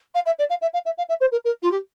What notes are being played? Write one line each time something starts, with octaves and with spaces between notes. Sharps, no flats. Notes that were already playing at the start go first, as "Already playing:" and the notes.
F5
E5
D5
F5
E5
F5
E5
F5
E5
C5
A#4
A#4
F4
G4